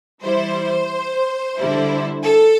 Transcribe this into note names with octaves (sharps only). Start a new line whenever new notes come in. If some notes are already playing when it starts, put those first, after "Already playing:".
E3 G3 E4 C5
D3 G3 E4
A4